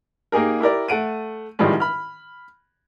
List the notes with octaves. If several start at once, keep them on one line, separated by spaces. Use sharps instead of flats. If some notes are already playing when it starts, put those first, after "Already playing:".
A#3 D#4 G4 G#4 A#4
E4 G4 A#4 D5
A3 F#5 D7 D#7
A1 A2 D#3 F3 G3 G#3
B5 F6